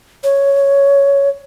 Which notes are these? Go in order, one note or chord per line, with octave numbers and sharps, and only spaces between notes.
C#5